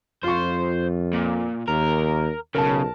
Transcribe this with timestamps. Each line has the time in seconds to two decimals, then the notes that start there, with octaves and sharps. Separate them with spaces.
0.24 F2 F4 C5 C#6
1.13 A#2
1.68 D#2 A#4
2.55 B1 C#3 A#4 A5